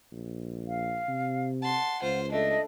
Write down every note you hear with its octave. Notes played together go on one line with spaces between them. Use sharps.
A#1
F5
C3
F#5 A5 C6
C#2 F4 C5
A3 D4 D#5